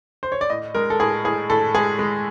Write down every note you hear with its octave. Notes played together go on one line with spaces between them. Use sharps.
C5
C#5
D5
A2 D#5
G#3 A#4
A4
A2 G#4
A2 G#4
A2 A4
G#3 G#4
G#3